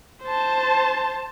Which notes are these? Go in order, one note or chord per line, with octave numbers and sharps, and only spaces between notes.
C5 A5